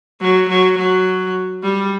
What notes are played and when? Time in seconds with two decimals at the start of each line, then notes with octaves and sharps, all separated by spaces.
0.21 F#3
0.49 F#3
0.78 F#3
1.63 G3